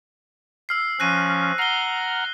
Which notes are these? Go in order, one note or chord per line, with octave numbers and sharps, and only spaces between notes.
E6 F6 C7
F3 C#4 F#6 A#6 D#7
F#5 A#5 F6 C7 G7